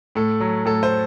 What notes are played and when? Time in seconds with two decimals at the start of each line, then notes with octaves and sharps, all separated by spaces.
0.15 A2 A4
0.40 F#3
0.65 A2 A4
0.83 C5